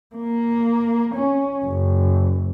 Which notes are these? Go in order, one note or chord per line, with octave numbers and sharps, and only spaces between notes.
A#3
C#4
F#1